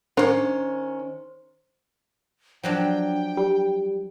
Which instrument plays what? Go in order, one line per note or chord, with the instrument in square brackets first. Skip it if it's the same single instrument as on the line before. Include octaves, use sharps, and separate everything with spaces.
[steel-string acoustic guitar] D#3 C#4 [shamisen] D4 A#4 C#5 [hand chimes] C5
[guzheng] F3 F#3 D4 [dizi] G5
[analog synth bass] G3